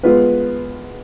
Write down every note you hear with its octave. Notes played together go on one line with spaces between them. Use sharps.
G#3 B3 F4 B4